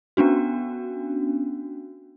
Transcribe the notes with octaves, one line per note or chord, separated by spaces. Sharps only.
B3 C#4 D4 F#4